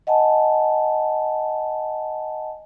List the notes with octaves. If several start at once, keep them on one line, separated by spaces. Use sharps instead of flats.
D#5 F#5 G#5 A5